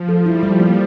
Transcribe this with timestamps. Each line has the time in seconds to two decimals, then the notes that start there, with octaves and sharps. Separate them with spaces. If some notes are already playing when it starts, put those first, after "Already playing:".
Already playing: F3
0.09 A4
0.25 G3 E4
0.43 G3
0.60 A#3